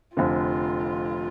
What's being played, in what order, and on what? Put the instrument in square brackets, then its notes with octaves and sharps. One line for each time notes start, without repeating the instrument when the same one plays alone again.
[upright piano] F1 F2 D3 F3 [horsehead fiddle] F4